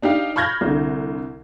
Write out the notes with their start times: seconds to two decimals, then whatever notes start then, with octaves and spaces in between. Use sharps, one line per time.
0.02 D4 D#4 G4 F5
0.36 B5 C#6 F6 G6 G#6 A#6
0.61 C2 D3